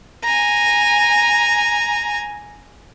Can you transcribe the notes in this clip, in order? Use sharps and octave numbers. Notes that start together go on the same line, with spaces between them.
G#5 A#5